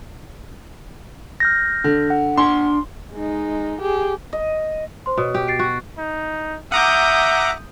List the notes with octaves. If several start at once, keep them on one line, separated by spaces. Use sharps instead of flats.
F6 G6 A#6
D3
F#5
D4 G#5 C6
G#3 D#4
G4 G#4
D#5
C5 C6
B2 B4 C#5 D#6
G4
A6 C7 D7
F#4
D#4
E5 F#5 A#5 D6 D#6 G6